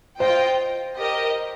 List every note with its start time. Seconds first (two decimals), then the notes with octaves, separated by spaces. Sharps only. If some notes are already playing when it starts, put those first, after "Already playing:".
0.20 F4 C5 D#5 G5
0.97 G4 A#4 D#5